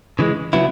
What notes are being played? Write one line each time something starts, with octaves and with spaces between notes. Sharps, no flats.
C#3 E3 G#3
C#3 F#3 B3 E4